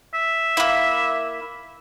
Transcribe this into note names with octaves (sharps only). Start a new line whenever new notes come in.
E5
A#3 E4